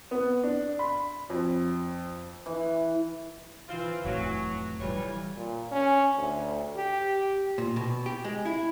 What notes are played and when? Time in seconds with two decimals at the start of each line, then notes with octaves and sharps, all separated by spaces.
0.11 B3
0.44 D4
0.79 B5
1.30 F2
2.46 E3
3.69 E3 C4 F4
4.05 F1 A2 F#3
4.80 D2 E3 G3 F4 C#5
5.36 A#2
5.72 C#4
6.18 D2
6.77 G4
7.58 A#2
7.76 B2
8.06 G4
8.24 G#3
8.45 E4